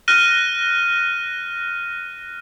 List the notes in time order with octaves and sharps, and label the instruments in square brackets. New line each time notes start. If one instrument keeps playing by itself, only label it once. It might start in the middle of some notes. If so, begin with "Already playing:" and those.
[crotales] F6 F#6 A#6 D#7